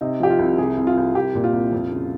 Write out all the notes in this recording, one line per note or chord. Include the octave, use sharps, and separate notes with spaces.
C3 D#4
F3 G4
F4
C2
C3 G#4
C2
F4
C2
C2 G4
A#2
F4
C2
F2
C#3